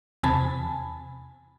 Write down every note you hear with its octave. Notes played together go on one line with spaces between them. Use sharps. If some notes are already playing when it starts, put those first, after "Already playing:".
E2 C3 G#5 A5 B5